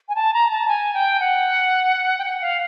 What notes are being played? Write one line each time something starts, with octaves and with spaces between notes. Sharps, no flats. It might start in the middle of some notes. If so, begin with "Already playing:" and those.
G#5
A5
A#5
A5
G#5
G5
F#5
G5
F#5
F5